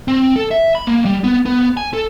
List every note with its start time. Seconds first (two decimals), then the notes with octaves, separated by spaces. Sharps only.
0.08 C4
0.36 A4
0.51 E5
0.75 B5
0.87 A#3
1.05 G3
1.24 B3
1.46 B3
1.77 G#5
1.94 A4